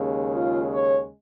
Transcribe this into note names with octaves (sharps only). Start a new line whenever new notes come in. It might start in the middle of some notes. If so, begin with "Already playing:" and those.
Already playing: D#2 C#3 G#3
F4
C#5